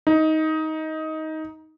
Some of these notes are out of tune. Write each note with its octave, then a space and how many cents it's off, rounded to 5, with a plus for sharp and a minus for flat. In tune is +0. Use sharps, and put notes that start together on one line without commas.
D#4 +15